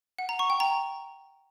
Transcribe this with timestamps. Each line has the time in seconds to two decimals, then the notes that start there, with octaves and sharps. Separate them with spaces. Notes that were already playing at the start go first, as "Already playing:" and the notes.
0.19 F#5
0.29 A#5
0.39 C#6
0.50 G5
0.60 A#5